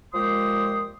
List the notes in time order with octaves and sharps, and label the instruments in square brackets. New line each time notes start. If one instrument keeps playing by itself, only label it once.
[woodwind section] A#2 F3 G#3 G4 C6 D#6